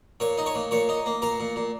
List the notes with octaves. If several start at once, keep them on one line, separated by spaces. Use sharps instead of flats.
A#2 C#5 C#6
D#4
C#5 C#6
A#2
A#2 C#5 C#6
D#4
A#3
A#2 A#4 A#5
A#2
A#2